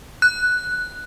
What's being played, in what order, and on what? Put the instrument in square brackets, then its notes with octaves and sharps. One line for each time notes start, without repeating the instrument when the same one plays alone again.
[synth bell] F#6